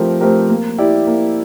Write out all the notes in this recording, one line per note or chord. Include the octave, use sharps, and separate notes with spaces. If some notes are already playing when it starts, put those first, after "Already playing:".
Already playing: F3 A3 C4 G4 A#4
A3 C4 G4 A#4
A#3
E4 G4 D5
A#3